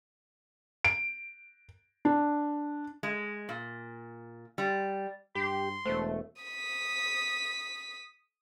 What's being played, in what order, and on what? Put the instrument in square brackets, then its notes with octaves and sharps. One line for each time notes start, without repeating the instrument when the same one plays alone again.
[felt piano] D7
D4
[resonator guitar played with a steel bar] G#3
A#2
G3
[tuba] G2 [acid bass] G4 [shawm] C6
[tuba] E1 [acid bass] A3 [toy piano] C5
[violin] D#6 B6